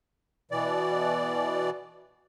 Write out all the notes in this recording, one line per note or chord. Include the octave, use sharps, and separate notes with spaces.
B2 E3 D5